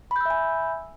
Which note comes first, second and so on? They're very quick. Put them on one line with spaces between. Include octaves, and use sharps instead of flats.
B5 G6 E6 E5 G#5